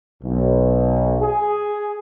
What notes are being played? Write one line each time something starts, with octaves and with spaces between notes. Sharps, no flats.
B1
G#4